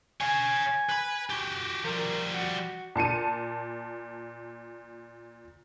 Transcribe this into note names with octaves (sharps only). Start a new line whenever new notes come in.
C#5 F5 G#5
B4 B5
F#4 G4
F3 G3 A#4
F#4
A#2 A5 C#7 D#7